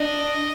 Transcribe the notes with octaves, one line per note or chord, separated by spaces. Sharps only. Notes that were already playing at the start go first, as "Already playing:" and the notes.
Already playing: D4 D#5